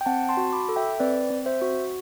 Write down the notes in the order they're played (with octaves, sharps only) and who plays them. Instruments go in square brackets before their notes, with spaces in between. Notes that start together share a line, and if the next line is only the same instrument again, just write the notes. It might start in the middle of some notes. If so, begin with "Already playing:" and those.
[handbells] G5
C4 F#5 A5
A5 C6
F#4
B5 D6
A4
E5 G5
C4 B4 D5
C4
C5 E5
F#4